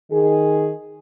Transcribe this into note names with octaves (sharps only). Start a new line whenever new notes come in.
D#3 G#4